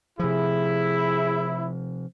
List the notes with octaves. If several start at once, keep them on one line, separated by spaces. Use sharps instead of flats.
C3 F3 E4 G#4